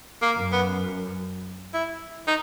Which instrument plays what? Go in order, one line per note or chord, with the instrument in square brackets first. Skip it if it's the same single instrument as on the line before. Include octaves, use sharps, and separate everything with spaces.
[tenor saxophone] A#3
[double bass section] F#2
[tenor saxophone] B3
E4
D#4